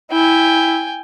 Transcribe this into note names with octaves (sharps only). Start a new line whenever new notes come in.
E4 G5 G#5